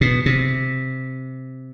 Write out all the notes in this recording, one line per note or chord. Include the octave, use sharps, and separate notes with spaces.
B2
C3